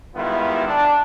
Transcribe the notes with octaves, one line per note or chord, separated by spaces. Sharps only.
D#3 G3 G#3 B3 E4 F4
D4